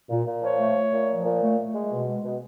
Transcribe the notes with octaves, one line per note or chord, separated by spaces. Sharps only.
A#2
A#2
F3 C#5
A3
A3
A#2
F3
A#2
A3
A3
G#3
B2
G#3
B2